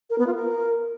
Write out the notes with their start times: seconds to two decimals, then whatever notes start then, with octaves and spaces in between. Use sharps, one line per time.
0.10 A#4
0.18 B3
0.27 F4
0.35 A#4